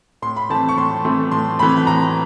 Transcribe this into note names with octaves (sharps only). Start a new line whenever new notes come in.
A2 C6
B5
E3 A3 C4 A5
C#6
A2 C6
E3 A3 C4
A2 C6
E3 A3 C4 B5
A2 A#5